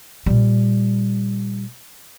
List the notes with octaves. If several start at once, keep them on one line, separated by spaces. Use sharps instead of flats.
A#2 G3